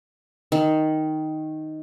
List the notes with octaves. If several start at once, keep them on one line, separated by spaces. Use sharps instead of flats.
D#3